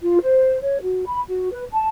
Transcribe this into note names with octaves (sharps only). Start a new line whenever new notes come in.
F4
C5
C#5
F#4
B5
F#4
B4
A5